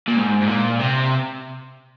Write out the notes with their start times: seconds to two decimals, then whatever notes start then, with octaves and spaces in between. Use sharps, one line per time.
0.08 A#2
0.16 G#2
0.41 G#2
0.48 A#2
0.80 C3